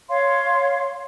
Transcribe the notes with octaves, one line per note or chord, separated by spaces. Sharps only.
C#5 F5 C6